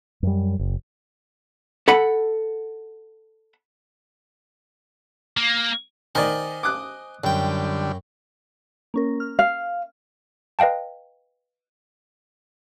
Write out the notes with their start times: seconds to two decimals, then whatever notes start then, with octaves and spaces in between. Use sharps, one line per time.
0.23 F#2 G3
0.59 F#1
1.88 A4 F#5 B5
5.37 A#3
6.15 D#3 C5 D5 D#5 G#5
6.63 D6 D#6 F#6
7.24 F#2 D3 G3 G5
8.94 A#3 C#4 A#4
9.20 F6
9.39 F5
10.59 B4 D#5 F5 G5 A5